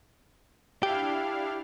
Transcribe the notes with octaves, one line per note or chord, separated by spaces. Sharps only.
D4 E4 G4 F5